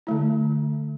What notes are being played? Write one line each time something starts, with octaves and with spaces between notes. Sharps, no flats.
D3 A3 E4